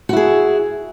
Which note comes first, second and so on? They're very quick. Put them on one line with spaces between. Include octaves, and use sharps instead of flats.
F#4 E4 G#4